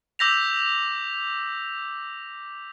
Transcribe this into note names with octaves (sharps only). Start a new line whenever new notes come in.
D6 E6 G6 A#6 B6 F7